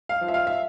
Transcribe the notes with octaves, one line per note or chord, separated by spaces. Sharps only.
F5
F3
E5
F5
E5